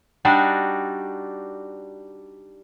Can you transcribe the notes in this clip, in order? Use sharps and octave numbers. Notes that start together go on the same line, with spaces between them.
G3 D4 D#4 F#4